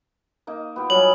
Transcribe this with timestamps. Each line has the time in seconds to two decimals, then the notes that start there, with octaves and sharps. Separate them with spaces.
0.47 A#3 D#4
0.76 B3 F4 G4
0.90 F#3 G3 G#4 F#7